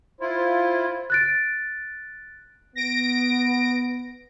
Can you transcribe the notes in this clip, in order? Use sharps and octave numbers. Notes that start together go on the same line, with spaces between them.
E4 F4 C5
F#6 A6 D7
B3 A#6 D7